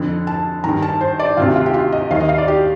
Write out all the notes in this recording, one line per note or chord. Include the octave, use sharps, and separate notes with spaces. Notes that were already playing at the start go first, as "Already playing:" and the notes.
Already playing: F2 D3
A5
G2 D#3 A#5
A5
C5
D5
D2 C3 D#3 F4
F4
G4
F4
D#5
D#2 D#3 F5
D#5
F5
D5
G4